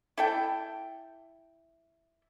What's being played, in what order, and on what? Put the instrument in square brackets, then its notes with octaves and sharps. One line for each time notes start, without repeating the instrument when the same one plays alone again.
[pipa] E4 A4 G5